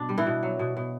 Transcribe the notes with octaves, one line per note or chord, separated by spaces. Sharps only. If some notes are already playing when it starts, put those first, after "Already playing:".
Already playing: B2 D4
G3
E3 E4
B2
F#3
B2
B2